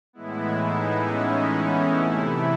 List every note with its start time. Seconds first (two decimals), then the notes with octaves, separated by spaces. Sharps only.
0.13 A2 E3 G#3 B3 E4
0.58 D#4
1.03 C#4
1.93 C3 E3 A3 E4